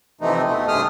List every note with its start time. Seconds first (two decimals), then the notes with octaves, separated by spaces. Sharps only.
0.21 F2 C3 E3 A3 D#4
0.45 B2 A3
0.68 G2 C3 A3 G#4 D#6 F6